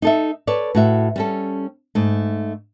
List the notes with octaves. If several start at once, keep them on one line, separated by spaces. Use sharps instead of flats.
D#4 A4 E5
A4 B4 C#5 D5
A2 F#4 E5
G3 C#4 A4
G#2 A3